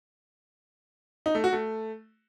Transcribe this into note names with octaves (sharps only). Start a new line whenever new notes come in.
D#4
A3
F#4
A3